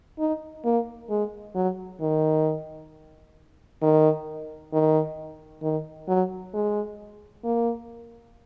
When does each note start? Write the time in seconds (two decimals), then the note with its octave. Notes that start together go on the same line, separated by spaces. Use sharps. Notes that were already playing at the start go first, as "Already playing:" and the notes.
0.19 D#4
0.65 A#3
1.10 G#3
1.55 F#3
2.01 D#3
3.82 D#3
4.73 D#3
5.63 D#3
6.08 F#3
6.54 G#3
7.44 A#3